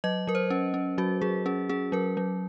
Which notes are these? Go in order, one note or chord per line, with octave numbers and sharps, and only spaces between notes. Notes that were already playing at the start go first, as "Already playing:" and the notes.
F#3 D#5
F#3 A#4
C5
C#4
C#4
F#3 F#4
F#3 G#4
C#4 G#4
C#4 G#4
F#3 A#4
F#3